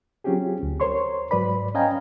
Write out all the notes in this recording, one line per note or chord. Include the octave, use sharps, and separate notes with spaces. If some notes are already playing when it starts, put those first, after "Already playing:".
F#3 C4 C#4 F4 G4 G#4
D2
A#4 C5 C#5 C6 C#6
G#2 F#3 B4 D5 B5
C#4 D#5 F5 G5 G#5 A#5